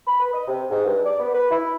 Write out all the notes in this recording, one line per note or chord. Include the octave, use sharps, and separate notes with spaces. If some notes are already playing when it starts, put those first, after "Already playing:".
B5
B4
D#5
C3
G#2
G2
D5
B3
B4
E4